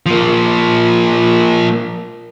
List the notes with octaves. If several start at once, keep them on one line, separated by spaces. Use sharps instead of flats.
F3 A#3